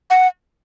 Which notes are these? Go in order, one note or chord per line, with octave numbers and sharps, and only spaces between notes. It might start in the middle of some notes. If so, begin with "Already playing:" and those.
F#5